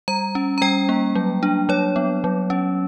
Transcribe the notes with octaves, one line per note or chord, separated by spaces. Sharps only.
G3 A#5
C#4
A#5
G3 G5
A#3
F#3
D4
F#3 C#5
B3
F#3
C#4